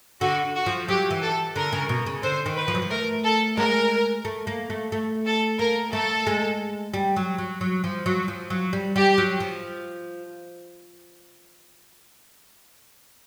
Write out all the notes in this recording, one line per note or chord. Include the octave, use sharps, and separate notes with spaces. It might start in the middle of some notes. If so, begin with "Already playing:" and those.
D3 F#4
F#4
F3
F#3 G4
E3
A4
D3 A#4
C#3
B2
C#3
D3 C5
D#3
B4
F3
F#3
F3
A3 A#4
A4
G#3 A#4
A3
A#3
A3
A3
A4
A#3 A#4
A3 A4
G#3
G3
F#3
F#3
F#3
F3
F#3
F3
F#3
G3
G3 G4
F#3
F3